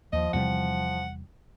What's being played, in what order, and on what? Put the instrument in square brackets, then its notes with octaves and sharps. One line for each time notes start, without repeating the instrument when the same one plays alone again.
[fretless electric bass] D#2 [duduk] F3 [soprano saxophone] D#5
[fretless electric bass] E2 C3 G3 [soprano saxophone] F#5